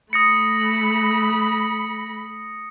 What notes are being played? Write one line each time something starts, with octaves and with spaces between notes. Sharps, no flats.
A3 B5 D#6 A#6 C#7